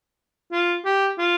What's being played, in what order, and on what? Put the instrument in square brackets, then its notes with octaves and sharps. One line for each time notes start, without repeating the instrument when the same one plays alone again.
[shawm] F4
G4
F4